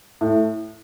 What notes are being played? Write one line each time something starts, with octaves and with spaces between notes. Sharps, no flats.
A2